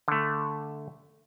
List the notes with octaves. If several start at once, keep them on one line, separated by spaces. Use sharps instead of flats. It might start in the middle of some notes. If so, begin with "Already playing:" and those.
D3 A3